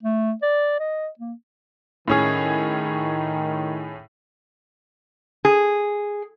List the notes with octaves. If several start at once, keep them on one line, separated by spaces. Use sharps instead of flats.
A3
D5
D#5
A#3
A2 D#3 C#4 G#4
G#4